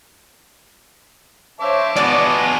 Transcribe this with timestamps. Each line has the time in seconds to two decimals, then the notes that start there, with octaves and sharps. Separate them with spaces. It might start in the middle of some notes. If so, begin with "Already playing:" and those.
1.60 C5 C#5 E5 F5 A5 D6
1.96 G#3 B3 F#4 D5